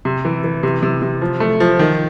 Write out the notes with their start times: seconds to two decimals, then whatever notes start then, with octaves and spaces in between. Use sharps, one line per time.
0.05 C3
0.25 E3
0.44 E3
0.63 C3
0.83 C3
1.02 C3
1.21 F3
1.40 A3
1.60 F3
1.79 D#3